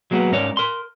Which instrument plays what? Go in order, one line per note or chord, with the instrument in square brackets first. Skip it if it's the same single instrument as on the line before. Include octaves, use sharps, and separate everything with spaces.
[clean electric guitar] F#3 G#3 A#3 B3
G#2 C#4 A#4 C#5 D5
A#4 C6